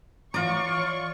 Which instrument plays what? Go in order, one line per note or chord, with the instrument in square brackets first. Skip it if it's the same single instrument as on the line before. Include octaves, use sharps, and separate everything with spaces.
[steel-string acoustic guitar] E3 A#5 [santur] F4 D5 [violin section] C#5 C#6